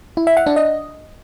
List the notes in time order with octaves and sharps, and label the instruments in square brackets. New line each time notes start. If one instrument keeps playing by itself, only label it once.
[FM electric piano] E4
E5
F#5
D4
D#5